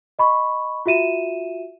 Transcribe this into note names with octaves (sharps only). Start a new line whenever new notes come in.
D#5 B5 C#6
F4 F#4 E5 D#7 E7